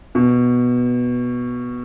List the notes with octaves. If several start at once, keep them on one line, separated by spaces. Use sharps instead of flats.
B2